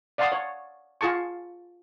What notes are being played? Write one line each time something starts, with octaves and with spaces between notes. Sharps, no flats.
D5 F5 F#5 A5 C6 D#6
C#5
F4 G#4 A5 C#6